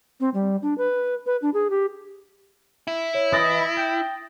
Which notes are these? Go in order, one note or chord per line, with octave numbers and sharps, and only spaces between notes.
C4
G3
D4
B4
B4
D4
G#4
G4
E4
C#5
E3 B4 D#5 D#6 A6 A#6
G5